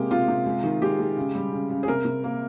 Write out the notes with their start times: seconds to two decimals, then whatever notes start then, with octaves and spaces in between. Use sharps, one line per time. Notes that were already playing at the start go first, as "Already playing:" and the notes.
Already playing: C3 G#3 A#3 G4
0.11 C3 F4
0.28 C3
0.46 G#3
0.64 D#3
0.82 G#3 G4
0.99 G#3
1.17 C#3
1.35 G3
1.53 C#3
1.70 C#3
1.83 G#4
1.88 C3 A#4
2.05 C3
2.24 A#3